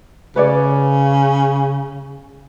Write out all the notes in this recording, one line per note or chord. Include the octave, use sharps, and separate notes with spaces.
C#3 B4 C#5 D5